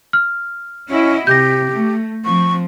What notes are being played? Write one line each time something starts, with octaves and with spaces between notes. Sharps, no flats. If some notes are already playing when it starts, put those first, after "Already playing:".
F6
C#4 E4 F#4 D#5
C3 G4 G6 A#6
A3
F3 C4 C#6